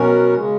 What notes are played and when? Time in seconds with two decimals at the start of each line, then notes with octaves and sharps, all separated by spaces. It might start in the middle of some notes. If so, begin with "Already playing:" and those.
Already playing: B2 F#3 C#4 F#4 A#4
0.35 C#3 G#3